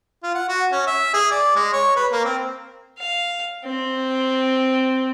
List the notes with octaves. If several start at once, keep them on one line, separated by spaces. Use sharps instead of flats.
F4
F#5
F#4
C#4
E5
G#4
D5
G#3
C#5
B4
A#3
C4
F5
C4